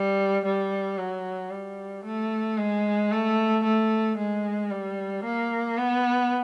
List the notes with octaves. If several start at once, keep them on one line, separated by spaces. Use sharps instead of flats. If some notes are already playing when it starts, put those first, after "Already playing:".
Already playing: G3
G3
F#3
G3
A3
G#3
A3
A3
G#3
G3
A#3
B3